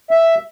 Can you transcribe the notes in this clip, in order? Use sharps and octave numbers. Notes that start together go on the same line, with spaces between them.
E5